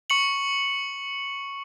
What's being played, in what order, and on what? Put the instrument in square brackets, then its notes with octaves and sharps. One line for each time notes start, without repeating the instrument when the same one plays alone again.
[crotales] C#6 C#7 F#7